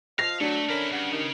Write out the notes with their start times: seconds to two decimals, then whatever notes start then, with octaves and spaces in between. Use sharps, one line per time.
0.19 F3 D#5 F5 A#6
0.41 F#3 A3 D4
0.69 E2 D3 C#4 E4 A#4
0.92 G2 C#3 F#5
1.12 G2 D#3